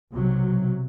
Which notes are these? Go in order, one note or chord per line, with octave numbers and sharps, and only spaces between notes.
B1 C3 F#3